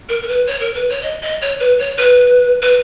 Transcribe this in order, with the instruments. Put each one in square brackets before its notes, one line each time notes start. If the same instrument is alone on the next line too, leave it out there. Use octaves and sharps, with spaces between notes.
[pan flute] A#4
A#4
B4
C#5
A#4
B4
C#5
D#5
D#5
C#5
B4
C#5
B4
B4